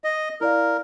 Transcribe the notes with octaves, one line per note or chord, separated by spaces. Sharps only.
D#5
E4 A#4 D5 F5